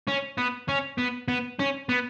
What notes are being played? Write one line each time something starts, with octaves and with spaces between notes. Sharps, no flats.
C#4
B3
C#4
B3
B3
C#4
B3